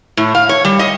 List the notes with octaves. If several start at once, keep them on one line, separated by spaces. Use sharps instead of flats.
A2
F5
C#5
G3
D#5